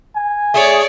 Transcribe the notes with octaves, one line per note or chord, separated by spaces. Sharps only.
G#5
A3 G#4 C#5 D5